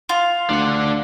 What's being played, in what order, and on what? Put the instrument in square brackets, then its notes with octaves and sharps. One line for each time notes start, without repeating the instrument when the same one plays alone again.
[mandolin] F4
[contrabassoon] D2 [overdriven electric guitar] D4 F#5